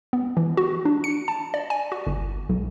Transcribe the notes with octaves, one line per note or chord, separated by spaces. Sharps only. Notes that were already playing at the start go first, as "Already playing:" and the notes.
B3
E3
F#4
D4
C#7
A5
D5
G#5
F#4
G1
B1